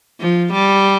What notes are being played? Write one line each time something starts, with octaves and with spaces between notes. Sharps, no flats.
F3
G3